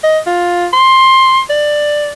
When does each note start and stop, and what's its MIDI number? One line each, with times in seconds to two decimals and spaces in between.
0.03 0.19 75
0.26 0.66 65
0.73 1.40 84
1.49 2.12 74